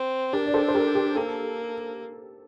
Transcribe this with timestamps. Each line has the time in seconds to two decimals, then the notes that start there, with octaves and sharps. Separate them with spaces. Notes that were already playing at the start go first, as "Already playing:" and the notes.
Already playing: C4
0.33 D4 G4 A#4
0.46 D5
0.54 A4 C5
0.68 C5
0.74 G4 A#4
0.95 G4
1.15 A#3 A4